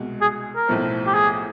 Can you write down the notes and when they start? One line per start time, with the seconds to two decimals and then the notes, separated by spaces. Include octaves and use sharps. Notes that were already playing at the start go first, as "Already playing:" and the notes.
Already playing: C2 B2 G#3
0.21 G#4
0.56 A#4
0.68 B1 A2 F3 A3 C4
1.06 G4
1.14 G#4